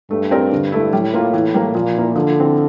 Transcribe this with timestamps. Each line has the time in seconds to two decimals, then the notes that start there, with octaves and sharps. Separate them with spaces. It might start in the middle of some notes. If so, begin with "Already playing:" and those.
0.11 G2 A3
0.31 C4 G4 A#4 D5
0.52 D3
0.72 A3 E4
0.92 A2 G3
1.14 A#3 F4
1.34 E3
1.54 G3 A#3
1.74 A#2 F3
1.95 A#3 E4
2.15 D3 F3
2.36 C4 E4